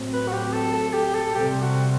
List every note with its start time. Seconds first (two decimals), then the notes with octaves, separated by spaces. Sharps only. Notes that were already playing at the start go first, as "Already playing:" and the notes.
Already playing: A2 F#3 A3 C4
0.13 B4
0.28 F#4
0.33 G4
0.53 A4
0.73 A4
0.93 G4
1.14 A4
1.33 C3 G3 C4 G4
1.62 F#4